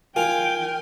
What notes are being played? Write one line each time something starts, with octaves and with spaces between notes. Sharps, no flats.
F4 A#4 F5 G5 G#5